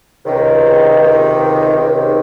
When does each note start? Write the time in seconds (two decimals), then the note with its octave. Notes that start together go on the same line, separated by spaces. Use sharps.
0.25 C#2 C3 D#3
1.01 C#2 C3 D#3
1.76 C#2 C3 D#3